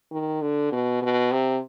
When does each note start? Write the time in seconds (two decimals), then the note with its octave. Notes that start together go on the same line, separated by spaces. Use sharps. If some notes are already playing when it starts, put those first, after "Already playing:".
0.11 D#3
0.41 D3
0.72 B2
1.02 B2
1.32 C3